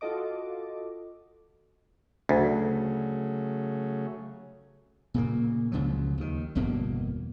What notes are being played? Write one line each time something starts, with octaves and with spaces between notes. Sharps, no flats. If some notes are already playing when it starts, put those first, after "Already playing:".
F4 F#4 A4 D#5 D6
D2 C#3 F#3 A3
A#2 C#3 A#3
C#2 C#3 F3 F#3
D#2 D#3
G1 E2 B2 A#3